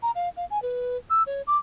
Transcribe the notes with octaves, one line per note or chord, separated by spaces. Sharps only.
A#5
F5
F5
G#5
B4
E6
C#5
D6